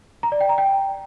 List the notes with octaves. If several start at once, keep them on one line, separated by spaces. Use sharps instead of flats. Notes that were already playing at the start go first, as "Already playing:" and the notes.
A#5
D5
G5
A#5
G5